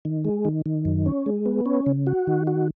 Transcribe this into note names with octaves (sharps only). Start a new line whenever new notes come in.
D#3
G#3
D#3
D#3
F#2
C#4
G#3
B3
C#4
C#3
F#4
D#3
F#4